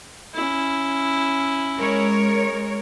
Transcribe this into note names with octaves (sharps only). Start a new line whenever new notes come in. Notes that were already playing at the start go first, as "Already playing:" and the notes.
C#4 E4
G#3 A#4 C#5